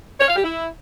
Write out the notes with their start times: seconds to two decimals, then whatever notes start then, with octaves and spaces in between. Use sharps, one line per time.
0.20 C#5
0.28 F5
0.36 G4
0.44 E4